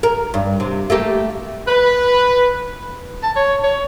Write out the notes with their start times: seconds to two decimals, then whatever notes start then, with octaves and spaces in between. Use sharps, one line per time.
0.03 A#4
0.34 G2
0.60 C3
0.90 A3 A#3 G4
1.68 B4
3.23 A5
3.36 C#5
3.64 C#5